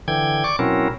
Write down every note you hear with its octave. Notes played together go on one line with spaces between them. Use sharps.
D3 E3 G5 G#6
D5 C#6 D6
B2 F#3 C4 C#4 E4 A#4